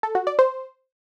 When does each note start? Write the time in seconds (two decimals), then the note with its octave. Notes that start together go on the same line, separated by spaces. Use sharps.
0.03 A4
0.15 F#4
0.27 D5
0.39 C5